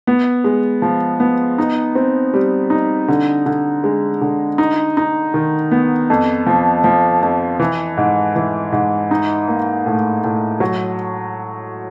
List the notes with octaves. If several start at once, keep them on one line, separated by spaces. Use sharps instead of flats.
B3
G#3
F3
B3
D#4
C4
G3
D#4
D3
D3
G#3
D3
D#4
D#4
D#3
B3
F2
F3
F3
F2
E3
G#2
E3
G#2
D#4
A#3
A2
A2
F#3